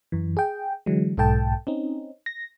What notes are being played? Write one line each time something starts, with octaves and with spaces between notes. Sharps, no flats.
F#2 E3
G#4 G5
D3 E3 F#3 G#3
B1 G#2 A4 G5 A5
C4 C#4 D#4
A#6